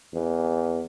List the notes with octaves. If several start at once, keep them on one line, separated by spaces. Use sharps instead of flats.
E2